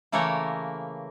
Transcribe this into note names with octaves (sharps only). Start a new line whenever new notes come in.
C#3 E3 A3 A#3 A#4 C#5